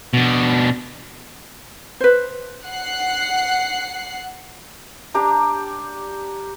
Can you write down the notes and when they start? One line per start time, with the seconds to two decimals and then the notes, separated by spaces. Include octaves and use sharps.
0.13 B2 D4
2.00 B4 C5
2.67 F#5 F#6 C7
5.14 D4 G4 A#5